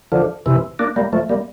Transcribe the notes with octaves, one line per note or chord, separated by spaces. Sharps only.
D3 F3
C3 E3
A#3 D4
G3 A#3
F3 A3
G3 A#3